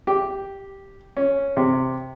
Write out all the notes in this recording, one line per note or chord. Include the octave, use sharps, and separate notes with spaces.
G4
C#4
C3